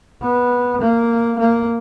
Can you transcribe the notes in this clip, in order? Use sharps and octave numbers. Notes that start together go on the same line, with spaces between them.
B3
A#3
A#3